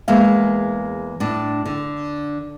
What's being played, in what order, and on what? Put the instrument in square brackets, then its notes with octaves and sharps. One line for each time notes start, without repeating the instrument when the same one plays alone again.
[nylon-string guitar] E2 G#3 A#3 E5 F5
A2 D4
D3